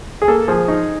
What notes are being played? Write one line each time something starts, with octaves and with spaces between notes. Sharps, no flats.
G#4
A#3 A4
F3 G#4
D#4